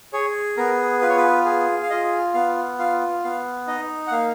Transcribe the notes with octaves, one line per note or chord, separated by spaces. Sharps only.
G#4 C#5
B3 A#4
F4 B4
C#5
B4
G#4
F5
F4 D#5
B3 F5
F4 F5
B3 F5
D#4 D#5
F#5
A#3 F5